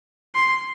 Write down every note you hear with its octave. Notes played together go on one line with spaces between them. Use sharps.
C6